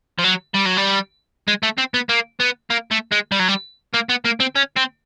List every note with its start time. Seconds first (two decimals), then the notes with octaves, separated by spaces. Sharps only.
0.19 F3
0.24 F#3
0.55 G3
0.66 F#3
0.78 G3
1.48 G#3
1.63 A3
1.78 C4
1.94 B3
2.09 A#3
2.40 B3
2.70 A#3
2.91 A3
3.12 G#3
3.32 G3
3.40 F#3
3.48 G3
3.94 A#3
4.09 B3
4.25 A#3
4.40 C4
4.55 C#4
4.76 C4